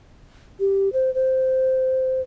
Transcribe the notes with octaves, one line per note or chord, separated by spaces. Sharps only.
G4
C5
C5